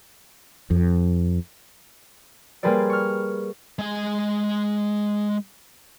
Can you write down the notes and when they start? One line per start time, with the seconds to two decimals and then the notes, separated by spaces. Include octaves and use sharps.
0.71 F2
2.63 G3 A#3 G#4 B4 C5 D5
2.90 C#6 F6
3.79 G#3 G#5